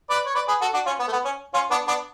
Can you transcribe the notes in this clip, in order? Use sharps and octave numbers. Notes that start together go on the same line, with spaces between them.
B4 D5
C#5
B4 D5
G#4 B4
F#4 A4
D4 F#4
C#4 F4
B3
A3
B3
C#4
C#4 F4
B3 D4
B3 D4